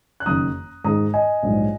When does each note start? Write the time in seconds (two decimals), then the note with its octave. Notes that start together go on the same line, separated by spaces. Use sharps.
0.20 F#6
0.26 F#1 F#2 D#3 A#5 D#6
0.84 G#2 D#3 G#3 D#4 A#5 D#6
1.14 D#5 G#5
1.43 A#1 G#2 F#3 D#4